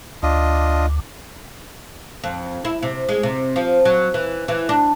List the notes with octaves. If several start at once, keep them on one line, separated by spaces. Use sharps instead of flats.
D2 D4 F4 D#5
F2
E4
C3
G#3
C3
F3
F#3
E3
E3
D4